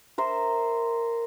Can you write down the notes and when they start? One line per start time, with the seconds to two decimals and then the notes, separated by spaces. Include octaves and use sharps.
0.18 A#4 C5 E5